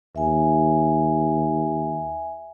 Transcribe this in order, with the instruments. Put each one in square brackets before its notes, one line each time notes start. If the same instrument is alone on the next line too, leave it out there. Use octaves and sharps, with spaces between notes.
[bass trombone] D#2 [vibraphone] E5 G#5